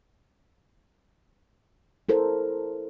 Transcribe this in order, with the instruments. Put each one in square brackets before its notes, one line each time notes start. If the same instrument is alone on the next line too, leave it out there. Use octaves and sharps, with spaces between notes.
[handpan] E4 A4 A#4 C5